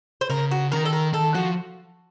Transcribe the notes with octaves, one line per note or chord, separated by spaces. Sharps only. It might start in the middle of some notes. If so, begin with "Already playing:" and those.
C5
C#3 A#4
F#4
D#3 A#4
A4
A#4
D#3 A4
F3 F#4